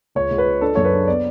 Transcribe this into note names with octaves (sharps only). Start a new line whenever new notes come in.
C#2 C#5
C#2
B4
C#3
D4 A4
F#2 C#5
B4
D4
B3 D5